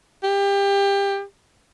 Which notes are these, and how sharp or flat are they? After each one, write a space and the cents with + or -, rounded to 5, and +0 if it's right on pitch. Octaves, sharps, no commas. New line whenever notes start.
G4 +25